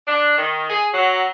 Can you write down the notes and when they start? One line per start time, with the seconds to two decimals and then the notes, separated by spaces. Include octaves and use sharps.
0.07 D4
0.36 D#3
0.69 G#4
0.94 F#3